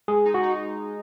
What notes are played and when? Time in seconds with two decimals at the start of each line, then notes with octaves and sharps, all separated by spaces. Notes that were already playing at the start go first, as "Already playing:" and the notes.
0.08 G#3 G#4
0.25 D#4
0.34 F#4
0.43 D#4